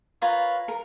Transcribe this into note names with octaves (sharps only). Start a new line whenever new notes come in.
F4 A#4 B4 C#5
A#4